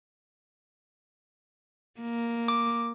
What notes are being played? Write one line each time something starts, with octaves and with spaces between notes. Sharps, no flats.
A#3
D6